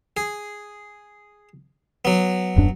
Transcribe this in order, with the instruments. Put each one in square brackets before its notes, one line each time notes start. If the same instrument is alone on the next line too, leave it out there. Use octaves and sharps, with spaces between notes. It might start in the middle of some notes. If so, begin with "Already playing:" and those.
[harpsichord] G#4
F#3 B3
[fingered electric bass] D#1 F#2 D4